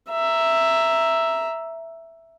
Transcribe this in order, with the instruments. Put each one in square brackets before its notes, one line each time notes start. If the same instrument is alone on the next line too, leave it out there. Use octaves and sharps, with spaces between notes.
[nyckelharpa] E5 A#5